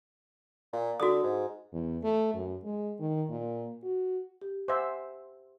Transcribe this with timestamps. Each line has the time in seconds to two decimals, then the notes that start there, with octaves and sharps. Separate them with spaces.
0.73 A#2
1.00 D3 F#4 D#6
1.23 G#2
1.73 E2
2.03 A3
2.34 F#2
2.64 G#3
2.99 D#3
3.30 A#2
3.83 F#4
4.42 G4
4.68 C5 E5 F#5 G#5